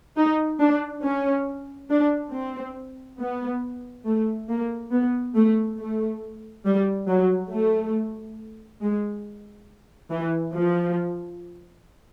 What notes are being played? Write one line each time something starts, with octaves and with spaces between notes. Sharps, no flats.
D#4
D4
C#4
D4
C4
B3
A3
A#3
B3
A3
A3
G3
F#3
A3
G#3
E3
F3